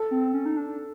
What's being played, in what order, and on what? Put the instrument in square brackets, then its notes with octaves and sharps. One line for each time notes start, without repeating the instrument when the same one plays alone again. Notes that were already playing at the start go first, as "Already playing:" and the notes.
Already playing: [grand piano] A4
[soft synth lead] C4
C#4
D#4
D4